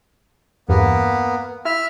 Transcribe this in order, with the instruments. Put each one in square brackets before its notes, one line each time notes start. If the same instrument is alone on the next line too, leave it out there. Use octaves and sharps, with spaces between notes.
[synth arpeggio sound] E2 G2 [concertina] A#3 B3
[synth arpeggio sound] E4 [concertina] E5 F6